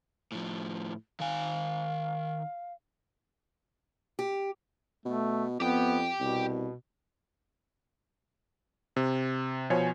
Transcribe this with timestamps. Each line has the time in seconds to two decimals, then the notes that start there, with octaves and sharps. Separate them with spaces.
0.32 A2 F3
1.20 D#3 F5 G#5
4.19 G4
5.05 B2 A3
5.60 F2 B3 G4 G5
6.20 C2 B2
8.96 C3
9.70 B2 F3 C5 C#5 G#5